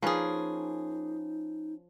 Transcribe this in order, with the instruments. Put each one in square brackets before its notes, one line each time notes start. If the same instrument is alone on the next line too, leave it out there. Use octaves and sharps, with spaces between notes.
[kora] F3 C#4 B4 [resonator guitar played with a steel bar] A#3 G#4 [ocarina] D#4